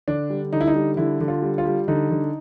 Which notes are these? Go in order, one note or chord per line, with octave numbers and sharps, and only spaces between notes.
D3 D4
G3
D3 D#4
E4
D#4
G3
D3 E4
D3
F4
G3
F4
G3
D3 D#4
D3